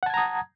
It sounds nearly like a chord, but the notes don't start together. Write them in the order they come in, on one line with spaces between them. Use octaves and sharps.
F#5 A5 G#6 A#5 D#6